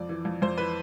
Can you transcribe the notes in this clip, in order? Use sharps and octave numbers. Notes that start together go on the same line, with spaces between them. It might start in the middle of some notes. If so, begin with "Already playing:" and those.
Already playing: F2 D5
E3
F2
F2 C5
E3 B4